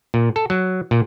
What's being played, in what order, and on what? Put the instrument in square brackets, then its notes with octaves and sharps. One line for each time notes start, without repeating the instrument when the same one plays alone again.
[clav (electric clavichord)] A#2
A4
F#3
A#2